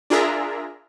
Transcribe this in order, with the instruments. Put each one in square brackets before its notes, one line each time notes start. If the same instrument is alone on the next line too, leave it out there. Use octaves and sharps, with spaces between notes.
[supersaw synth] D4 F4 G#4 A#4 E5 A#5